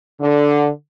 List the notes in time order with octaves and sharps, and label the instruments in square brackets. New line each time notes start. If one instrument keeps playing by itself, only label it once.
[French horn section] D3